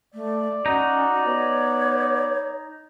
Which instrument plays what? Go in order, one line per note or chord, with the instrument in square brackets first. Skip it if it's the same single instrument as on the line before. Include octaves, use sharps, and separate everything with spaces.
[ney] A3 [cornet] D5
[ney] C#4 [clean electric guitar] D#4 [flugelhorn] F#4
[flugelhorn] B3 [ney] C#5